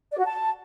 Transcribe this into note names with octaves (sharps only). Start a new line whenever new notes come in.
D5
F#4
A5